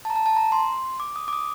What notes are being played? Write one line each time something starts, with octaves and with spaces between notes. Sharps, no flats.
A5
A#5
A5
A5
A#5
C6
D6
D#6
D6
D#6